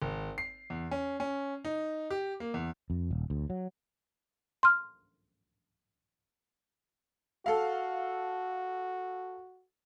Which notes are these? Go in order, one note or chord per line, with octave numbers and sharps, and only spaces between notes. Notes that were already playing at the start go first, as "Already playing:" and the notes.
G#1
C7
E2
C#4
C#4
D#4
G4
A#3
E2
F2
D#1
D2
F#3
C6 F6
F#4 A4 F5